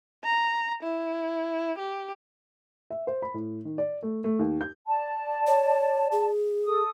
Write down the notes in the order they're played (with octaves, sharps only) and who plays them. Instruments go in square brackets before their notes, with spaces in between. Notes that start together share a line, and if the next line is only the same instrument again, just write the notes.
[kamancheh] A#5
E4
G4
[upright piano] E5
C5
B5
A2
D#3
D5
A3
A3
D#2
G6
[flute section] D5 A5
[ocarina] C#5
G#4
[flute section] A4 D#6